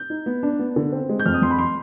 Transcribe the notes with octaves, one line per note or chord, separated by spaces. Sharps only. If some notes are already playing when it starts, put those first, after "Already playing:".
Already playing: G6
D#4
B3
D4
B3
D3
C4
G#3
G6
F2 F6
D#6
F2 C6
B5
C6